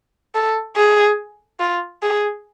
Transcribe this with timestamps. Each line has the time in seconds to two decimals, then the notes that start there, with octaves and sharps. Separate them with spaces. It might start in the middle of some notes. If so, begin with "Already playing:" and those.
0.35 A4
0.76 G#4
1.60 F4
2.03 G#4